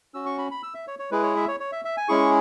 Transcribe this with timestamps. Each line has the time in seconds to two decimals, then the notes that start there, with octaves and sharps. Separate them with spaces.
0.14 C#4 F#4 E6
0.26 C#6
0.38 B5
0.51 B5
0.63 E6
0.74 E5
0.88 C#5
0.99 C#5
1.11 G#3 E4 G#4 B4
1.23 C#5
1.36 E5
1.48 C#5
1.60 C#5
1.72 E5
1.85 E5
1.97 G#5
2.08 G#3 C#4 E4 G#4 C#6